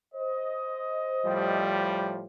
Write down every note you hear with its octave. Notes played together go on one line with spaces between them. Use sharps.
C5 D#5
A2 F3 G3